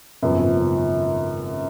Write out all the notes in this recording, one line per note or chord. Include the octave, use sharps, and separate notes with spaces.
G#1 F#2 C#3 F3 B3